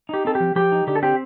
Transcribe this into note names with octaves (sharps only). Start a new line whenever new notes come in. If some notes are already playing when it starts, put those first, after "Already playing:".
D#4 G4
C4 A4
G4
F3
F3 G4
D#4
D3 G4
A4
C4 G4